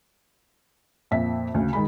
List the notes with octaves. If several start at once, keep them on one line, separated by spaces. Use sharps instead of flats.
F2 A#2 E5 B6
D2 C#3
D#3 G#3 B5